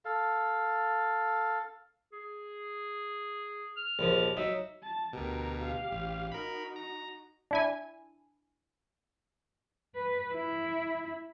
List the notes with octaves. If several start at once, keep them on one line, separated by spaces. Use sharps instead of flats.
A4 F5
G#4
F6
A#1 D#2 F3
F#3 D#4 E5
A5
D2 B2 G4 A#4
G4 F5
A1
D#4 F#4 A#4 B5
A#5
D4 E4 G#5
B4
E4